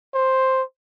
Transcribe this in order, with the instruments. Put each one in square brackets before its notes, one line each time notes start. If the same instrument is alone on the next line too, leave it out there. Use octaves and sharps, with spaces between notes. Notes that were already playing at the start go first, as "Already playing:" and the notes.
[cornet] C5